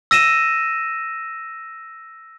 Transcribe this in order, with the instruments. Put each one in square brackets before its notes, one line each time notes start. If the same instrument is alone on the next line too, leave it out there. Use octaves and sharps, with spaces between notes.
[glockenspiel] E6 A#6 D#7 E7